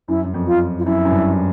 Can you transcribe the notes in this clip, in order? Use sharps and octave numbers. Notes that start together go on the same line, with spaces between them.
F#2 E4
F#2
F2
F4
F4
F#2 E4
F#2
G2